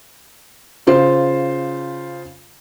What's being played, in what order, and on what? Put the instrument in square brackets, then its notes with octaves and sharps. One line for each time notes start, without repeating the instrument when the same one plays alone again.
[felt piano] C#3 F4 C5